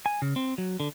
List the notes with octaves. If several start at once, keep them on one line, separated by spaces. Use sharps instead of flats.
G#5
C#3
C4
F#3
D3